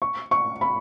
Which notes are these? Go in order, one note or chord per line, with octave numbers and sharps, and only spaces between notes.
C#6
C#6
B5